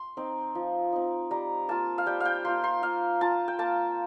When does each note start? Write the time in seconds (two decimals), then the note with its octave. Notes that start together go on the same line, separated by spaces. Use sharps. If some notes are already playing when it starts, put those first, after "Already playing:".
Already playing: C6
0.17 C4 D#4
0.55 F3
0.92 C4 D#4
1.31 G3 A#5
1.69 A#3 F4 A5
1.98 F5
2.06 G3 G5
2.20 F5 G5
2.45 A#3 F4 C6
2.64 C6
2.82 A#3 F5
3.21 F4 A5
3.48 G5
3.59 A#3 A5